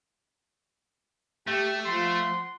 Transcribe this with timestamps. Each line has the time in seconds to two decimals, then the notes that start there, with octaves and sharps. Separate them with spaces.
1.47 A3 G4 G5
1.85 F3 F#5 C6